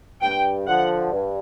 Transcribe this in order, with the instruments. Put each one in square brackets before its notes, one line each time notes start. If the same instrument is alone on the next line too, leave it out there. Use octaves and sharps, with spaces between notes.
[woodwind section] G2 [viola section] G5
[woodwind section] D3 F3 [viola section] F#5
[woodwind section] G2